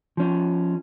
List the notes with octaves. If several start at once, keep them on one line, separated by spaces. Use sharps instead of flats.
F3 C#4